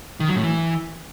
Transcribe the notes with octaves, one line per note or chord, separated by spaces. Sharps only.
D#3
F#3
A2
E3